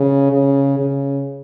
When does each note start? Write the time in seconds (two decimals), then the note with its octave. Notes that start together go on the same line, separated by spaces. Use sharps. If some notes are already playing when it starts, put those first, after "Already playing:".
Already playing: C#3
0.32 C#3
0.79 C#3